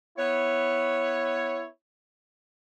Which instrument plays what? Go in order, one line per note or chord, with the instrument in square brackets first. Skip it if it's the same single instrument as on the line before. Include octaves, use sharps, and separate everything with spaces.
[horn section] B3 E4 C#5